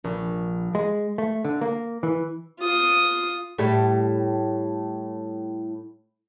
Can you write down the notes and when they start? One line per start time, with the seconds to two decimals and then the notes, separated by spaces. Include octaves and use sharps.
0.04 A#1
0.75 G#3
1.18 A3
1.45 D3
1.61 A#3
2.03 E3
2.60 F4 D#6
3.58 A2 G3